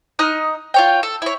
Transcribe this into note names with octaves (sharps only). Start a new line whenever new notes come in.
D#4 D#6 F6 F#6
F4 C#5 G5
A4
E4 C#5